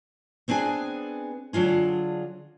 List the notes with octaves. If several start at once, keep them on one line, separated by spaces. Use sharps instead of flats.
B3 C4 D4 G#4 G#5
D3 F#3 D4 F4 G#4